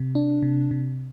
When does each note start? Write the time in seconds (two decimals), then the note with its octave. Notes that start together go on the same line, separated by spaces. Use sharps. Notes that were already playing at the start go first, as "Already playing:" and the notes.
Already playing: C3
0.15 D4
0.42 C3
0.71 C3